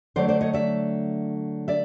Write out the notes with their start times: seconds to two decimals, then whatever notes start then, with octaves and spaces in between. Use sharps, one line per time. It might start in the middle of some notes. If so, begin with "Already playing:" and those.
0.16 D3 F#3 A3 D4 C5 D5
0.28 C5 D5
0.41 C#5 D#5
0.53 D5 E5
1.68 D5 E5